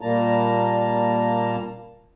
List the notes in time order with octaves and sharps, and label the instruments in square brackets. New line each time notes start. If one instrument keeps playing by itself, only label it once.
[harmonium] A#2 G3 A#3 A5 A#5